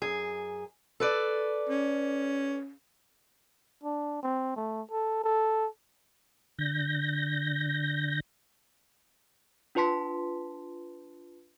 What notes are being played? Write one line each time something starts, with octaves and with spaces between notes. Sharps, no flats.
F#2 G#4
A4 B4 D5
C#4
D4
C4
A3
A4
A4
D3 G6 A#6
D4 F4 B4 A5 C6 B6